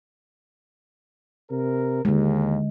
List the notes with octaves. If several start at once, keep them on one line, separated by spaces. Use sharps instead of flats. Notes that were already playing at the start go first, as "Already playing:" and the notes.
C3 A#4
D#2 D3 G#3